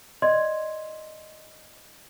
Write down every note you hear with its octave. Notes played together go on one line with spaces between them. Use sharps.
D5 D#5 C6 G#6